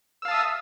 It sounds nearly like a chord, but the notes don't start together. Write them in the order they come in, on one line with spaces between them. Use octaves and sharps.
E6 F5 A5 D#6 E5